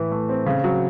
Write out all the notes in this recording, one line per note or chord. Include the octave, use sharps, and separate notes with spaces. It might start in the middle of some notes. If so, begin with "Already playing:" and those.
Already playing: A2 E3
A3
C4
C#3
F#3